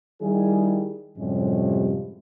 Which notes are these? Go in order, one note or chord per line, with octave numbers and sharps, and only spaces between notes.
D#3 G3 E4 G#4
F#2 A2 C3 F3 G3 G#3